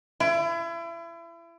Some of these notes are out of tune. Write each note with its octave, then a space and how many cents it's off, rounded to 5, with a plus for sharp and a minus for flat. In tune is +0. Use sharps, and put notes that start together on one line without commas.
E4 +35